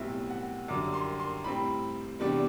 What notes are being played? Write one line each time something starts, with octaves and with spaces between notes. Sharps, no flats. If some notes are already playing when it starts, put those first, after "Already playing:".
Already playing: B1 A2 G3 C4 E5
F#5
F#2 D3 G3 D6
C6
C6
A2 G3 C4 B5
E2 C3 G3 D4